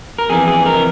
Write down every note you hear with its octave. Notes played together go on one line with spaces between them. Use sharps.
A#4
F2 E3 G#4
G#4
A#4